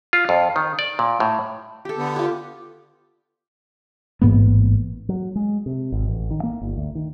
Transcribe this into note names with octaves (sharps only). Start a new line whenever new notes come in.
F4
F2
D#3
D5
A#2
A2
G4 A4
D3 B3
F4 G4
A1 G#2 A#3 B3
F#3
G#3
C3
G#1
A1
D#3
A#3
G1
D2
D#3